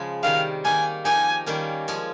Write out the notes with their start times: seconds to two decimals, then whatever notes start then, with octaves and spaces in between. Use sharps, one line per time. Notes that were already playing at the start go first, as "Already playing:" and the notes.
Already playing: C#3 F3 G#3
0.23 C3 D#3 G3 F5
0.65 D#3 A#3 D#4 G#5
1.05 F3 A#3 D#4 G4 G#5
1.46 D#3 G3 A#3 C#4
1.88 F3 G#3 C#4